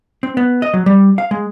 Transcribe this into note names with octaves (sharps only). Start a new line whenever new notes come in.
C4
B3
D#5
F#3
G3
F5
G#3